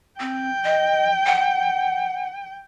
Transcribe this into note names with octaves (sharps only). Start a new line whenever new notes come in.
C4 G5
D#5
F#5